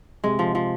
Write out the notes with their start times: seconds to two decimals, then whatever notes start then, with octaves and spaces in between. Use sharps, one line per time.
0.24 C3 G#3
0.39 F3
0.55 F3